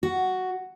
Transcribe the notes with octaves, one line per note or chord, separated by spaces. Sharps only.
F#4